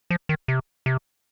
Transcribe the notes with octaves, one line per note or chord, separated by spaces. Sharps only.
F3
D#3
C3
C3